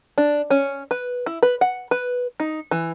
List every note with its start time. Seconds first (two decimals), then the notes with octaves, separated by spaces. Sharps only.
0.18 D4
0.50 C#4
0.91 B4
1.26 E4
1.43 B4
1.61 F#5
1.91 B4
2.40 D#4
2.71 E3